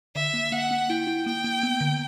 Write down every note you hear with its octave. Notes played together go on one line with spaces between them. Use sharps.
D3 E5
A#3
A#3 F#5
A#3
E4 G5
E4
A#3 G5
A#3
B3
D3